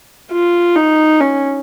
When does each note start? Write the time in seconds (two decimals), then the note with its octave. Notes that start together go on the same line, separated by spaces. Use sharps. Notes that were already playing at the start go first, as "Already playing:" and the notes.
0.31 F4
0.76 D#4
1.21 C#4